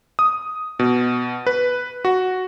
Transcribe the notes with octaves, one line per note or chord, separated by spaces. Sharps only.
D#6
B2
B4
F#4